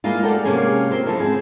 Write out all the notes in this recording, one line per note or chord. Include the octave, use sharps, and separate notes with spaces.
G3 G#3 A#3 E4 F4
G4 A4 A#4 D5 F#5 G5
C3 G#3 A#3 C#4 G4 G#4
C4 F4 G4 A#4 C5
D3 F3 G#3 E4 A4 C5
C4 G#4